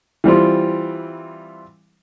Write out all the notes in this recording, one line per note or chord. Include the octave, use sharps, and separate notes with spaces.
E3 G3 C4 F4